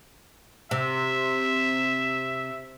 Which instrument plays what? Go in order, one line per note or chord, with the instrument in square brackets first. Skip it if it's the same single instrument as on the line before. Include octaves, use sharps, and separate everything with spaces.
[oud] C3 [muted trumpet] E5